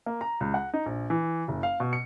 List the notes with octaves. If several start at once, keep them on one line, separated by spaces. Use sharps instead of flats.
A#3
A#5
C#2
F#5
D#4
A#1
E3
F#1
F5
B2
C#7